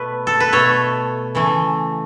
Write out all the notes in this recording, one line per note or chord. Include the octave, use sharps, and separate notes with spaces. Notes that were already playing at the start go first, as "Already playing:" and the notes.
Already playing: B2 A3 B4
A4
B4
B2 A3 A4 C#5
C#3 E3 A3